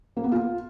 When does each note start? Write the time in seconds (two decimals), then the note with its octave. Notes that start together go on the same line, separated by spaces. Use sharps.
0.17 A#3
0.24 B3
0.32 F4